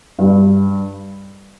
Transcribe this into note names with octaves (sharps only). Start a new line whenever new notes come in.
G2